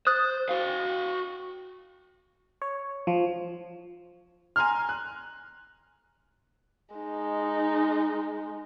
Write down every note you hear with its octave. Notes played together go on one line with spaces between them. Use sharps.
C5 D#6 F#6 A6
F#4 F5
C#5
F3
G#5 A#5 C6 F6
F#6
G#3 D#4